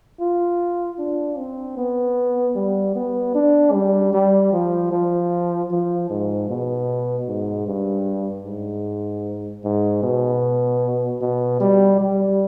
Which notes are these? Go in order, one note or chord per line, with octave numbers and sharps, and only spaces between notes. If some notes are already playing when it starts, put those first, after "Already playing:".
F4
D4
C4
B3
G3
B3
D4
G3
G3
F3
F3
F3
G#2
B2
G#2
G2
G#2
G#2
B2
B2
G3
G3